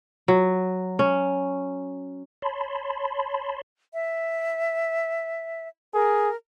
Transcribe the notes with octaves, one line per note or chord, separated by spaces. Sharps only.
F#3
C#4
C#5 A5 B5 C6
E5
G#4 A#4